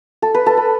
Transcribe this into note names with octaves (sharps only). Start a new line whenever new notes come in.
A4
B4
A4
B4